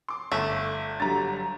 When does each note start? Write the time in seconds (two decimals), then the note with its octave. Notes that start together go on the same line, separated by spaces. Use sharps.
0.09 C6 D6
0.32 G1 A3
1.00 D3 F#3 G3 A#5 A6